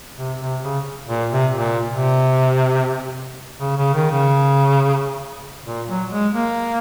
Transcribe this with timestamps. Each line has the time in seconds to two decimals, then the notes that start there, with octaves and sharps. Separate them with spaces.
0.17 C3
0.40 C3
0.62 C#3
1.08 A#2
1.31 C3
1.54 A#2
1.88 C3
3.60 C#3
3.77 C#3
3.94 D#3
4.11 C#3
5.66 A#2
5.89 F#3
6.12 G#3
6.34 A#3